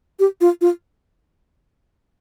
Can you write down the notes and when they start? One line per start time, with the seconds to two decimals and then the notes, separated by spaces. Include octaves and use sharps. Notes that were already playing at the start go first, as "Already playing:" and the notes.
0.20 G4
0.41 F4
0.61 F4